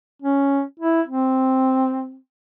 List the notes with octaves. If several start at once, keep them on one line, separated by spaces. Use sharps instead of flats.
C#4
E4
C4